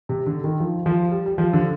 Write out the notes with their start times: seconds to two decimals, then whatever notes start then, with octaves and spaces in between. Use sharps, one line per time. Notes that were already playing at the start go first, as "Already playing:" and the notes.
0.09 C3
0.26 D3
0.44 D#3
0.60 F3
0.86 F3
1.11 G3
1.26 G3
1.38 F3
1.53 D3